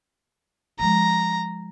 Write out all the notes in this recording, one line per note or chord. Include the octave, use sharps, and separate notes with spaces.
F3 G#3 A#5